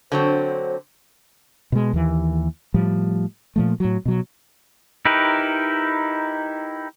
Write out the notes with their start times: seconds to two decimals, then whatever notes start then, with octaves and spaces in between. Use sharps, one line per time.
0.12 D3 F#3 C4 C5
1.72 B2 G#3
1.93 D#2 E3
2.74 A2 F3 G3
3.56 A#2 F3 A3
3.80 A2 F#3
4.05 B2 F#3
5.05 D#4 E4 G4 A#4 B4